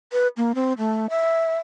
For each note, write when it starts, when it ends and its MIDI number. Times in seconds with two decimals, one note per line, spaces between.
0.13 0.28 71
0.37 0.52 58
0.55 0.73 60
0.78 1.07 57
1.10 1.55 76